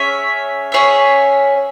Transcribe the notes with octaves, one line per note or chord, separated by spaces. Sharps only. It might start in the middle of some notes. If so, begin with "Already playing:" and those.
Already playing: C#4 G#4 C#5 E5
C#4 G#4 C#5 E5